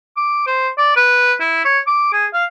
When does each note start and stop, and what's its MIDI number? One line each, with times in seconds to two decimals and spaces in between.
0.17 0.45 86
0.47 0.68 72
0.78 0.95 74
0.97 1.34 71
1.40 1.62 64
1.65 1.80 73
1.87 2.12 86
2.13 2.26 68
2.34 2.44 77